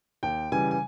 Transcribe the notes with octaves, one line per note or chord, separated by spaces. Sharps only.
D#2 G5
C#3 E3 G3 G#5
G#5